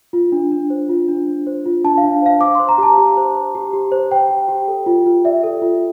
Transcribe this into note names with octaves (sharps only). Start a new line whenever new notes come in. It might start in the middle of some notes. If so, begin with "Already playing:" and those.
F4
D4
D4
C5
F4
D4
D4
C5
F4
D4 A5
F5
D4
C5 F5
C5 D6
C5 C6
A#5
G4 A5
G4
C5
C5
G4
G4
C5
C5 G5
G4
G4
A4
F4
F4
D5 E5
A4
F4